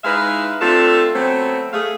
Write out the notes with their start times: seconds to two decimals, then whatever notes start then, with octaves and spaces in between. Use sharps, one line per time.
0.04 G#3 D#4 E4 B4 E5 F5
0.60 A3 C4 D4 F4 A4
1.14 F#3 A3 B3 C4
1.73 A3 G#4 F5